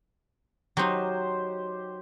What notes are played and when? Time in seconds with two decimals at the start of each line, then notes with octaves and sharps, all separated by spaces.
0.77 F#3 D#4 G4 C5